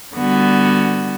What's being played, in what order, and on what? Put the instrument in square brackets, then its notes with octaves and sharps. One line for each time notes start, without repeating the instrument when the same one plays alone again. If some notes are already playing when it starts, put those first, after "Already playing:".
[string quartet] D3 G3 B3 F#4